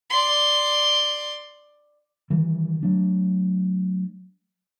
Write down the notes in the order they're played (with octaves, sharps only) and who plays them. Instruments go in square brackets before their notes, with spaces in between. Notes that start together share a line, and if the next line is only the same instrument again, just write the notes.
[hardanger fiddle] D5 C6
[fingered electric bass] D#3 E3 G3
F#3 A3 D4